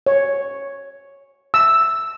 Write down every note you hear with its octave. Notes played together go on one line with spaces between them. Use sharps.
C#5
E6